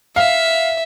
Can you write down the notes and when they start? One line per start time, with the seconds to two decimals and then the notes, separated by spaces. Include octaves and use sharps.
0.16 E5 F5